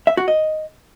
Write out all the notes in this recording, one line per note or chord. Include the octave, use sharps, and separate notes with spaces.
E5
F#4
D#5